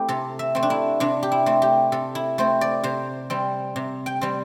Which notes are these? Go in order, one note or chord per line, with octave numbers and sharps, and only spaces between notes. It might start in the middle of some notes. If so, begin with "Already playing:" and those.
Already playing: A3 C4 E4 G4
C3 A4
E5
A3 C4
D4
E4
C3 D4
G4
E4
A3 C4
G4
C3 A4
E4
A3 C4 C5
D5
C3 C5
G3 C4
C3
G5
G3 C4